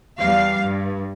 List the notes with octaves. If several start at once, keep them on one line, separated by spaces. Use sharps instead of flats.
E2 G3 F5
G2